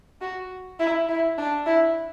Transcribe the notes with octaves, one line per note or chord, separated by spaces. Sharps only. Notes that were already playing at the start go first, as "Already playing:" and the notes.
F#4
E4
E4
D4
E4